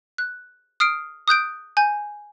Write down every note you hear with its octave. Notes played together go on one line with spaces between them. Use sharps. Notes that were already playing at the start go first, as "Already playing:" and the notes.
F#6
D#6 F6 C7 D7
D#6 F#6 G6 D7
G#5 G6